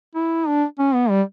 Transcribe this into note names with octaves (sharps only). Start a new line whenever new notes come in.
E4
D4
C#4
B3
G3